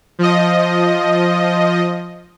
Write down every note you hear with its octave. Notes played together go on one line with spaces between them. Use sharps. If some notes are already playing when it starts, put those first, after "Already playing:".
F3 D#5